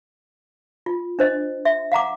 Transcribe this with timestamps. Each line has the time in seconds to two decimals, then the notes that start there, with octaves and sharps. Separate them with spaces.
0.86 F4
1.19 D4 C5 D#5
1.65 E5
1.92 F5 F#5 A#5 D6